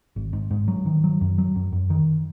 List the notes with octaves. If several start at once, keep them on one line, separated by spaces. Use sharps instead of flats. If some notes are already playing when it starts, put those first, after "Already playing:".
G#1
G#2
G#2
F#3
D#3
F#3
F#2
F#3
F#2
F#2
D#3